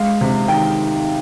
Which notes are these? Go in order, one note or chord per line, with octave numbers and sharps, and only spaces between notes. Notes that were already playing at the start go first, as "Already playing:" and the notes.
Already playing: G#3 F5
C3
D#3 G5